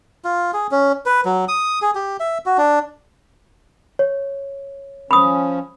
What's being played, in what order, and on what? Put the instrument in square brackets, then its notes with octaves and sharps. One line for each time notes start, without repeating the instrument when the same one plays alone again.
[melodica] F4
G#4
C#4
B4
F#3
D#6
G#4
G4
E5
F#4
D4
[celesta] C#5
[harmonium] F3 C#4 [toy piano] B5 D#6